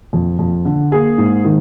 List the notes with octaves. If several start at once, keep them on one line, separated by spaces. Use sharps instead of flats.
F2
F2
D3
A#3 G#4
G#2
D#3